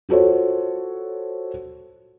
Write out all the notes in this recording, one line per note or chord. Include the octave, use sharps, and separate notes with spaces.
F4 F#4 A4 C5 C#5